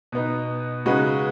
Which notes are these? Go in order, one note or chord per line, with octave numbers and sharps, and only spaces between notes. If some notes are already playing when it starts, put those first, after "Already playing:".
B2 B3 D#4
C#3 G#3 D#4 F#4 B4